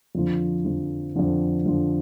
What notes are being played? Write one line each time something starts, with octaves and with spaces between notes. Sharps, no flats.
F2 D3 F3
F2 D3 F3
F2 D3 F3
F2 D3 F3